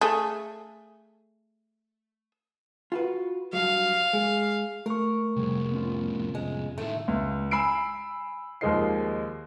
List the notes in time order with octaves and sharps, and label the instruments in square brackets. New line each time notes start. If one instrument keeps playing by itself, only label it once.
[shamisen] A3 G#4
[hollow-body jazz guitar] F4 F#4 B4
[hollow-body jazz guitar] G2 F#3 [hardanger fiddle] F5
[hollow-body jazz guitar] G#3
[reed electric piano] A3 C#6 [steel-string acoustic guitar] A#4
[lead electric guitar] C2 F2 [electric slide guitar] C3 G3 G#4
[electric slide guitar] B3 C#4 F4
[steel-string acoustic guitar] G#3
[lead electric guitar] A2 D#3 [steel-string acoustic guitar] A3
[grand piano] C#2
G#5 B5 E6 C7 D7
D#2 F3 G#3 A#3 D#4 C7